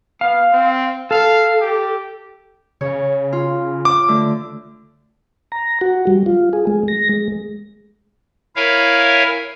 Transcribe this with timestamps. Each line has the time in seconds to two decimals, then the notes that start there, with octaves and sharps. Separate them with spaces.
0.21 B3 F5
0.52 C4
1.11 A4 F5
1.61 G4
2.81 C#3 C#5
3.33 F4
3.85 D6
4.08 D3 A3
5.52 A#5
5.81 F#4
6.07 G3
6.26 F4
6.53 G#4
6.67 G#3
6.88 A#6
7.09 G#3
8.56 E4 A#4 C#5 E5 F5 G#5